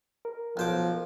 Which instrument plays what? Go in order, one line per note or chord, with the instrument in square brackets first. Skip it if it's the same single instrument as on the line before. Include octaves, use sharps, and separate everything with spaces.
[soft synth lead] A#4
[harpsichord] B1 C5 D6 [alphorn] F3